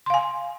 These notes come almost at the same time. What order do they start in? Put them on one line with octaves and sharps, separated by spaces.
C6 F5 G#5